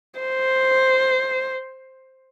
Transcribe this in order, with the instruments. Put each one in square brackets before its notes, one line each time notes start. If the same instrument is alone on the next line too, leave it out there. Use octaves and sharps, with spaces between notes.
[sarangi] C5